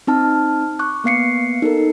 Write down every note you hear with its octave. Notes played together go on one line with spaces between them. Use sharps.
C4 D#4 A5 F6
C#6 D6 F#6
A#3 B3 F5 C7 C#7
D#4 A4 A#4